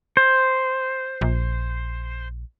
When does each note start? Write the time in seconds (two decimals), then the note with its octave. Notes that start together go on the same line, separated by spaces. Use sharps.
0.17 C5
1.21 A#1